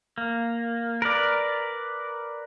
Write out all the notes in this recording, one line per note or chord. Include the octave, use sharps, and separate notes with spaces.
A#3
A#4 B4 D5